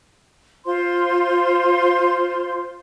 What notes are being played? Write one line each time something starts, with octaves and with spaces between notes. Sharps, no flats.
F4 C5 C6